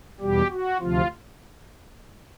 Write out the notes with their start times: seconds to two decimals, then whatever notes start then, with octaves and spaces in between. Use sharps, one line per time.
0.20 E2 B2 G3 G4
0.51 F#4
0.80 D2 C3 F3 F4